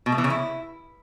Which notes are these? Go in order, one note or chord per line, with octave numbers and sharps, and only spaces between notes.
B2
A3
E3
C#3
E4